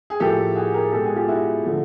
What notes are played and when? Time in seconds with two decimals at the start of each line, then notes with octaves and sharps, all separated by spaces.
0.10 G#4
0.20 A2 F3 A#3 G4 A4
0.55 F#4 G#4
0.74 G#4 A#4
0.92 B2 G#3 G4 A4
1.04 F#4 G#4
1.16 F4 G4
1.28 E4 F#4
1.63 D3 F3 A3